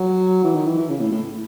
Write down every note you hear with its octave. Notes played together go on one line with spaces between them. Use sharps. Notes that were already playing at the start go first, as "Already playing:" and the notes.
Already playing: F#3
E3
D#3
E3
E3
C#3
A2
A2